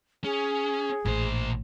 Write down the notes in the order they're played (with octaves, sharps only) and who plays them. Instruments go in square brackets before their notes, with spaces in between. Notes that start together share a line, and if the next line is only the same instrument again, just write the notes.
[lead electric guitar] C#4 [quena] G#4
[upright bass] A1 [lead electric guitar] A#2 C5